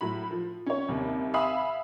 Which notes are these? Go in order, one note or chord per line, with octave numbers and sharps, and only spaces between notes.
A2 F#3 B5
F3
C#4 C#5
D#2 C3 G3
E5 F5 G#5 B5 D#6 E6